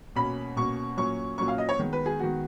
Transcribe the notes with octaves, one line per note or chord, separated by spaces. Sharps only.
B2 A#3 C#4 B5
B2 A#3 C#4 C#6
A#2 F#3 A#3 C#4 C#6
A#2 F#3 A#3 C#4 C#6
F5
D#5
C#5
D#3 G#3 B3
B4
G#4
D#3 G#3 B3 F#4